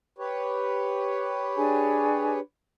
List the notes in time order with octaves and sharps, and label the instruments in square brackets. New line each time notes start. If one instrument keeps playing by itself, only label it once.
[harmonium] G4 B4 C#5
[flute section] D4 G#4 G#5